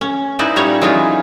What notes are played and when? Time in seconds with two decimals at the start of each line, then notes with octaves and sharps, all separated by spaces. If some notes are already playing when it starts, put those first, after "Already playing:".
0.01 C#4
0.39 D#4 E4 B4 C5 D5
0.56 A#2 G3 C#4 C#5 A#5
0.81 E3 F#3 G#3 C#4 D#4 F4